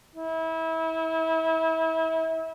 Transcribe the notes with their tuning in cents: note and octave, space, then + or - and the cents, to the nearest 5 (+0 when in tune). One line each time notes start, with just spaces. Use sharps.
E4 -30